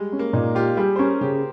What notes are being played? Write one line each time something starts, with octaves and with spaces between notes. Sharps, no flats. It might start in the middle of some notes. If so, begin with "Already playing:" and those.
Already playing: G3 G#3
C#4
A#3
A#2 D#4
F4 G4
G3 G#4
C5
C#4 A#4
C#3 G4